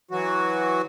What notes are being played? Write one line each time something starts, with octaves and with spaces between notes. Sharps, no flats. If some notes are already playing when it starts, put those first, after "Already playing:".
E3 F#3 F#4